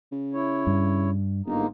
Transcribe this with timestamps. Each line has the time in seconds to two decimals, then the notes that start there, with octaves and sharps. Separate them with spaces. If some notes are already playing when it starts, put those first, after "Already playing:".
0.12 C#3
0.33 E4 C#5
0.67 G2
1.46 G1 G#2 A#3 D#4